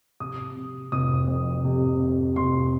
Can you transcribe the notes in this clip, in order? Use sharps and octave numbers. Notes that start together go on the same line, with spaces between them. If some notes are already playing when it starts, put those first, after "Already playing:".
C3 D#6
C3
F1 D#6
F2
C3
C3
F1 C6